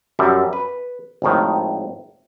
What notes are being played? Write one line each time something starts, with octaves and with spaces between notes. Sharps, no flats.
F#2 G3 E5
B4
G#1 F2 A2 D#3